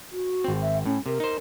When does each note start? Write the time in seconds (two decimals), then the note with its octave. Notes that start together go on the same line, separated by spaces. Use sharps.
0.12 F#4
0.44 G#1 C4
0.62 E5
0.86 A2 C#4
1.06 C3 A#4
1.20 D#4 C5